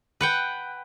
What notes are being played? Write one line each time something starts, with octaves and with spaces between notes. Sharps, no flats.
B4 F#5 G5